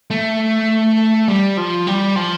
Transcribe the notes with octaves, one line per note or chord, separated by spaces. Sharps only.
A3
G3
F3
G3
F3